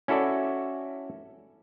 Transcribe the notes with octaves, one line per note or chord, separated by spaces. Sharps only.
C#4 E4 F#4 A4 D5